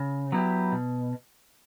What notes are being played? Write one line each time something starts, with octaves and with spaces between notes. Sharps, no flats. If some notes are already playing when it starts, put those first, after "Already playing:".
Already playing: C#3
F#3 B3 E4 G4
B2